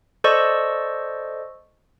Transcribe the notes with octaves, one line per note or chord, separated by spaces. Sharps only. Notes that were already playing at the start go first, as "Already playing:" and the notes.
A4 C5 D5 D#5 C#6 E6